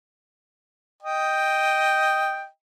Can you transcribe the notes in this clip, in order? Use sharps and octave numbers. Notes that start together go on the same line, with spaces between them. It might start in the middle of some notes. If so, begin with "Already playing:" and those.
D#5 G5